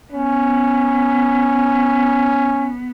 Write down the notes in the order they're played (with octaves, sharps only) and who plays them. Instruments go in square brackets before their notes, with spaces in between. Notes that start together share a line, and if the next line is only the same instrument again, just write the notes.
[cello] B3 [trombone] C#4